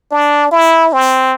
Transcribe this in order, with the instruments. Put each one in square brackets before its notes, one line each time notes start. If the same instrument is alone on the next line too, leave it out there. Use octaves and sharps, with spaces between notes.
[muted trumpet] D4
E4
C4